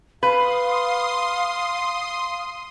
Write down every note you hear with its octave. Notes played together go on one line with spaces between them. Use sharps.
B4 F5 C6 D#6